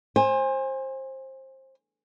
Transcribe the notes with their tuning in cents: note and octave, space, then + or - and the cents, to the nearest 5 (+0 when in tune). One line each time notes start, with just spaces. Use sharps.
C5 +25 G#5 -25